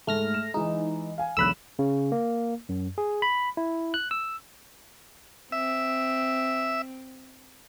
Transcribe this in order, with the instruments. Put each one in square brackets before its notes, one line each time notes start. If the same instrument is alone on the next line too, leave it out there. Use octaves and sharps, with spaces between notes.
[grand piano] G#2 [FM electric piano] A3 F6 A#6
[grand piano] E7
[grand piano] E3 G#3 [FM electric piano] D#4
[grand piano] F5 G#5
[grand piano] E1 B1 F#6 [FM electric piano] B5 E6
[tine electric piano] C#3
A#3
F#2
G#4
B5
E4
F#6
E6
[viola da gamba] C4 [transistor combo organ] E5